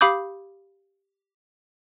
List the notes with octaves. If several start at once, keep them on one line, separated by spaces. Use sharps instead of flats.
G4 F5 B5 D6 D#6 G6